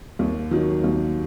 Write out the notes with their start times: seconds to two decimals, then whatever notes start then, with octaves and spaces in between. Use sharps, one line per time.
0.19 D#2
0.51 D#3 F#3
0.84 D#2